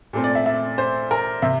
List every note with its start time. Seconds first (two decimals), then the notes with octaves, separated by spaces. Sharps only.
0.13 A#2 A3 C4
0.24 D5
0.35 E5
0.46 E5
0.78 C5
1.11 A#4
1.42 C3 E5